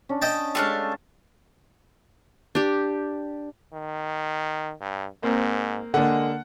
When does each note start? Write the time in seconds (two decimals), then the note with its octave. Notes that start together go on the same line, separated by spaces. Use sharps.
0.09 C#4 D4
0.22 D#5 G5 A5
0.55 G#3 A3 C#4 D4 G4 F5
2.55 D4 G4
3.73 D#3
4.81 G2
5.23 G#2 A#3 C4
5.94 D3 G#3 A#3 D4 F#5